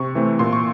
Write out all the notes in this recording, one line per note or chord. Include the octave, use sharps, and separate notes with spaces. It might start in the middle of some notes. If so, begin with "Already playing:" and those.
Already playing: C3 C#6
E3 A3 C4
A#2 C6
C#6